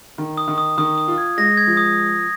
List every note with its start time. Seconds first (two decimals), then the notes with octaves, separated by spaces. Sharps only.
0.18 D#3
0.38 D#6
0.48 D#3
0.58 D#6
0.78 D#3 D#6
0.98 D#6
1.08 F4
1.18 G#6
1.38 G#3 A#6
1.57 G#6
1.67 F3
1.77 D#6